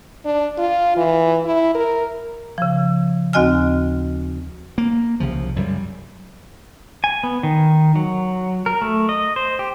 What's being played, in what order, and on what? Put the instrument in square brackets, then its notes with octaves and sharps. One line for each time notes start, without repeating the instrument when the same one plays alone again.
[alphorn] D4
F4
E3
E4
A#4
[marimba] C#3 F3
D#2 C4 F#4 D#5 G#5 F6
[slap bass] A#3
C2 C#3 F3
F#2 C#3 G3
[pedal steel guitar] G#5
B3
D#3
F#3
A#4
A3
D#5
C5
G4